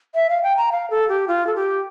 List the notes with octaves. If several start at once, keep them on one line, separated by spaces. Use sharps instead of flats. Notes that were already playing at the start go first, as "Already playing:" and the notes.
E5
F5
G5
A#5
F5
A4
G4
F4
A4
G4